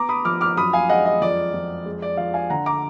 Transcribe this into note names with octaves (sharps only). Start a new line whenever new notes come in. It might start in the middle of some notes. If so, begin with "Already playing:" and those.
Already playing: B3 A#5 D6
B5 D#6
F3 D6 F6
D6 F6
F#2 B5 D#6
F5 G#5
G#3 D#5 F#5
D#5
F2 D5
F2
G#3
D5
F3 D5 F5
F5 G#5
D3 F#5 A#5
A#5 D6